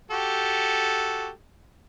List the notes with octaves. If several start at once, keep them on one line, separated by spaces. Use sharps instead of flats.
F#4 G4 A4